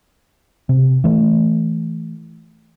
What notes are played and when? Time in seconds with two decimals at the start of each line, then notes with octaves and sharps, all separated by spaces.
0.69 C3
1.04 E3 A3